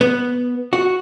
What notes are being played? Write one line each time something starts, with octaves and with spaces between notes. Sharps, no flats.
B3
F#4